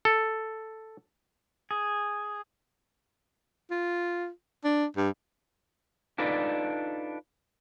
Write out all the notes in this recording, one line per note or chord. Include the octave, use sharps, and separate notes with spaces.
A4
G#4
F4
D4
G2
D4 D#4 F4 A4 B4 D5